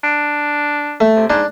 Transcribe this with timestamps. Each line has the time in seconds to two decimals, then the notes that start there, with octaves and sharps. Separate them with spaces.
0.04 D4
1.00 A3
1.16 C3
1.30 G#2 D4